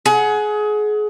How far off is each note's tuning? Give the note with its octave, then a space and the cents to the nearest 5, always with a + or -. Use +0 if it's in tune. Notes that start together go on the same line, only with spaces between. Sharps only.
G#4 +25 F#5 +0